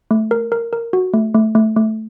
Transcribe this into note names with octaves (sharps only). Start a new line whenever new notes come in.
A3
A#4
A#4
A#4
F#4
A3
A3
A3
A3